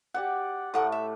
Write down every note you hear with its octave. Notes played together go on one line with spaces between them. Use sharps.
F#4 G4 D5 F#5
A2 A3 A#4 F#5 D#6
E5